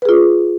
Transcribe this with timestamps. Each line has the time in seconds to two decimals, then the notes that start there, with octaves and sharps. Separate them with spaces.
0.02 B4
0.05 G#4
0.09 F4